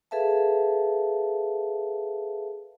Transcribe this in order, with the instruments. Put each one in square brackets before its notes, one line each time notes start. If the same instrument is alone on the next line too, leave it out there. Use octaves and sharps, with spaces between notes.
[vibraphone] G#4 A4 B4 E5 F5 A5